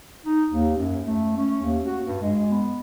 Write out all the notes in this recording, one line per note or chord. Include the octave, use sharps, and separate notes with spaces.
D#4
D#2
F#2
A3
C#4
D#2
F#4
G2
G#3
B3